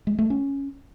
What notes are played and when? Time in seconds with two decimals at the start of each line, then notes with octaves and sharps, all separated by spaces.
0.07 G#3
0.19 A3
0.30 C#4